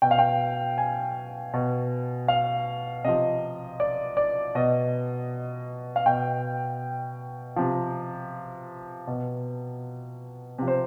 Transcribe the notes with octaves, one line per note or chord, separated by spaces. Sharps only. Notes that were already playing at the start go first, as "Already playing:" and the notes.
B2 G5
F5
G5
G#5
B2
F5
C3 F3 D#5
D5
D5
B2 D#5
F5
B2 G5
C3 F3
B2
C3 F3
C5